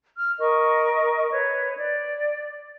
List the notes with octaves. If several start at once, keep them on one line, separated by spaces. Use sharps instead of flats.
F6
A#4 D#5 C#6
B4 C#5
D5